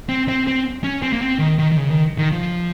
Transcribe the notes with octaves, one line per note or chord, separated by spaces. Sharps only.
C4
C4
C4
C#4
C4
A#3
C4
D#3
D#3
D#3
C#3
D#3
D#3
F3